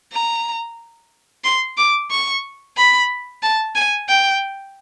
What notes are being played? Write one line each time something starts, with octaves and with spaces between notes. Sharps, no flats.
A#5
C6
D6
C#6
B5
A5
G#5
G5